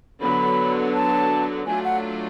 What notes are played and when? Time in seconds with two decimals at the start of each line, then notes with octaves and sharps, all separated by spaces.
0.22 D3 F#3 B3 B5
0.94 A5
1.67 F#3 A3 D4 F4 G#5
1.84 F#5